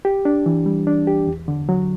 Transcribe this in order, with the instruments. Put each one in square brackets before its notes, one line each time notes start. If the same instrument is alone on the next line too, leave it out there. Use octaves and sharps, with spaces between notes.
[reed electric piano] G4
D4
E3
G3
D4
G4
E2
D3
F#3